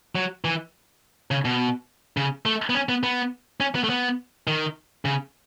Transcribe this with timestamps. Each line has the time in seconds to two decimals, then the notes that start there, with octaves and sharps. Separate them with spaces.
0.15 F#3
0.45 E3
1.31 C#3
1.45 B2
2.17 C#3
2.46 A3
2.70 B3
2.75 C#4
2.89 B3
3.03 B3
3.61 C#4
3.75 B3
3.84 A3
3.90 B3
4.47 D#3
5.05 C#3